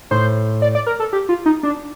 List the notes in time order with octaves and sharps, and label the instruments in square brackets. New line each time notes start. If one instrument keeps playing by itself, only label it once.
[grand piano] A2 [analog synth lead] C5
[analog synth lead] D5
D5
A#4
A4
G4
F4
D#4
D4